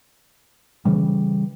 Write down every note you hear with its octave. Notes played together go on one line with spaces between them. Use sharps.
C#3 E3 G3